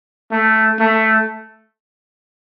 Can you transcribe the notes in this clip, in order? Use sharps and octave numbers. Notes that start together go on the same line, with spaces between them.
A3
A3